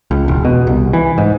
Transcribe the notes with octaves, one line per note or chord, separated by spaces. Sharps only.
C#2
E1
B2
C2
E3
G#2